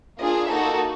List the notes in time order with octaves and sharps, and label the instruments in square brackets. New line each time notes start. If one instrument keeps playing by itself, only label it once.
[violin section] A#3 D4 F4 G#4 D#5
A#3 D#4 F#4 A4 E5